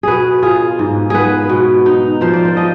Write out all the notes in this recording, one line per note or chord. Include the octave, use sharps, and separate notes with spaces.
B2 G#4 B4
F4 G#4
G#2
B3 G#4 B4
B2
D#4
F3 C5
D5
C5
F3 D#5